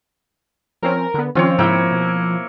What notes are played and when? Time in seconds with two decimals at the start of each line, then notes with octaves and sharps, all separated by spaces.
0.82 F3 C4 C#4 A#4
1.14 D3 B3
1.35 D#3 F3 C4 C#4 F4 C#5
1.59 G#2 C#3 A#3 E4 G5
1.92 B2